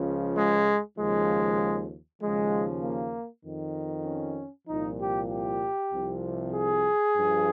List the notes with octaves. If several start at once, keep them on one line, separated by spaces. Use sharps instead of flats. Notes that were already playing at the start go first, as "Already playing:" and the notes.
Already playing: C#2 C#3 F3
G#3
D#2 C#3 F3 G#3
D#2 C#3 F3 G#3
A#3
F2 D#3
C#4
C2 A#2 F3 D#4
G4
G4
C2 C3 F3
G#4
G2 F3